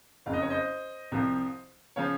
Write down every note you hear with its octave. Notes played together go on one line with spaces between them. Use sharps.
F#1 F2 C#3 F5
D#5
C#5
C5 D#5
C2 C3 F3
C#3 F3 C#5 F5